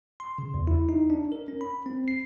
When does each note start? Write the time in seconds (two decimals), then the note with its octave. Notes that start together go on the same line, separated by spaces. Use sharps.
0.20 C6
0.38 C#3
0.54 E2
0.67 E4
0.89 D#4
1.10 D4
1.32 A#4
1.48 C#4
1.61 B5
1.86 C4
2.08 C7